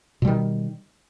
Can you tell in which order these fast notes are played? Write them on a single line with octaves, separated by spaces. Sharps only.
B2 G3 D#3